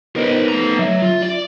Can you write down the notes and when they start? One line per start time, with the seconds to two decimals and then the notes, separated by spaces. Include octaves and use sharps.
0.16 B3 D#4 A#4 C5
0.48 A3 A#5
0.79 F#3 E5
1.02 F4
1.22 D5